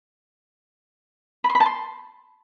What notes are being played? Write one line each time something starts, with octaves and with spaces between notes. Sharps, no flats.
B5
C6
B5
A5
C6